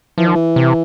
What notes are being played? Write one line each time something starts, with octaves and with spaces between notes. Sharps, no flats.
E3 F3
D#3
E3
C3